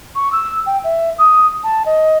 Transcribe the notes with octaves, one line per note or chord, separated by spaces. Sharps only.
C#6
E6
G5
E5
D#6
A5
D#5